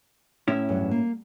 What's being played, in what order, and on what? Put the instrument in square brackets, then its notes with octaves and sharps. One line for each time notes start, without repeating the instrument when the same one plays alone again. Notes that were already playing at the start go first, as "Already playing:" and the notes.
[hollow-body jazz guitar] A2 C#4 E4 [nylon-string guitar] E5
[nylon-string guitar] E2 G2 F#3
A#3